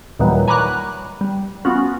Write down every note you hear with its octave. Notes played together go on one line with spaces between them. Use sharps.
D#2 A#2 D#3 E3 F#3 G3
G#5 A#5 B5 C#6 D6 F#6
G3
B3 C#4 F4 F#4